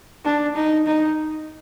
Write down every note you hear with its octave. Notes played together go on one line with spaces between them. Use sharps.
D4
D#4
D#4